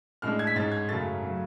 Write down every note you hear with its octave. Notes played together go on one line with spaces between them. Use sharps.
A2 G#3 D4 F6
G#6
B6
G#2 G#3 C#4 A6
G#6
F#2 C#3 F#3 A3 C#4 A6
C#3 F#3 A3